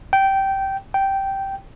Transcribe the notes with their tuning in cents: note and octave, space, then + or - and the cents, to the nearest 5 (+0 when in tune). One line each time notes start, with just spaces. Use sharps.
G5 -15
G5 -10